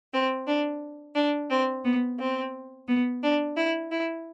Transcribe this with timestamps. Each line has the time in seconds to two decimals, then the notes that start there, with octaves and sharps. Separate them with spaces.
0.12 C4
0.46 D4
1.15 D4
1.50 C4
1.84 B3
2.18 C4
2.87 B3
3.22 D4
3.56 E4
3.91 E4